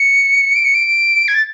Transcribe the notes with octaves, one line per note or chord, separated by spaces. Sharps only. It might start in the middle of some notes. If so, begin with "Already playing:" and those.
Already playing: C#7
D7
C#7
D7
G#6
A6